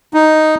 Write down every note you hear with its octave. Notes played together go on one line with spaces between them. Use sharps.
D#4